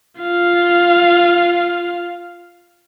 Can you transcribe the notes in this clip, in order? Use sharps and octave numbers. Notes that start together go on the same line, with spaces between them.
F4 F5